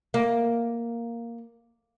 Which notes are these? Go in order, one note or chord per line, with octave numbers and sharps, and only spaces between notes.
A#3